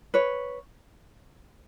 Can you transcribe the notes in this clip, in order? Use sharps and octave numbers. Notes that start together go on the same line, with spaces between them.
B4 C#5